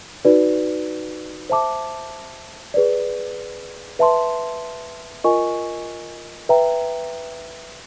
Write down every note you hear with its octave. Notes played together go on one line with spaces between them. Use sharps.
D#4 F#4 B4 D5
C5 E5 A5 D6
G#4 B4 D5
B4 E5 A5 C6
F4 A#4 D#5 G#5 C#6
B4 E5 G5 A#5